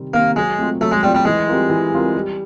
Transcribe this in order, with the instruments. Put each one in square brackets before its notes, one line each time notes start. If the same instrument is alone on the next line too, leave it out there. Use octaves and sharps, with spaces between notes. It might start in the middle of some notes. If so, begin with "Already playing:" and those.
Already playing: [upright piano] C3 D#3 G3 C4
[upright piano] D#3 G3 C4 [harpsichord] A#3
[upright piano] F#3 [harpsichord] G#3
[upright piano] A3 C4 F4
[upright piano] F#3 [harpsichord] A3
[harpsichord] G#3
[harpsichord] G3 [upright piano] A3 C4 F4
[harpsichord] G3
[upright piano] E3 [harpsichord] G#3
[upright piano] G3 C4 F4 A#4
E3
G3 C4 F4 A#4
G3